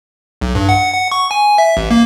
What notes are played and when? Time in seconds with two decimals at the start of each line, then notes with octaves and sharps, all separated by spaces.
0.41 B1
0.55 G2
0.69 F#5
0.93 F#5
1.12 C#6
1.31 G#5
1.58 E5
1.77 A1
1.91 A#3